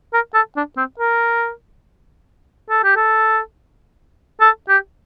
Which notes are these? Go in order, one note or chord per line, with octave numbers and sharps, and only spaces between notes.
A#4
A4
D4
C4
A#4
A4
G4
A4
A4
G4